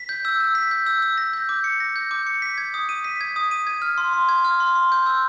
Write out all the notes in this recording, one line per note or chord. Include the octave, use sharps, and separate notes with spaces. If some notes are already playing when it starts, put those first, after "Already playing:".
Already playing: B6
G6
E6
E6
B6
G6
E6
E6
A#6
G6
D6
C#7
A#6
G6
D6
C#7
B6
G#6
D#6
D#7
B6
G#6
D#6
D#7
G#6
F6
C6
C6
G#6
F6
C6
C6
G6
E6